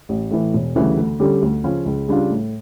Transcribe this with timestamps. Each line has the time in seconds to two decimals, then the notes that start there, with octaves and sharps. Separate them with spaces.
0.09 A1
0.31 A2 E3
0.53 E1
0.75 D2 C#3 E3 G3
0.97 D2
1.20 D3 G3 C#4 G4
1.42 D2
1.64 C#3 F3 C#4
1.86 C#2
2.08 C#3 G3 D4 F4
2.30 A2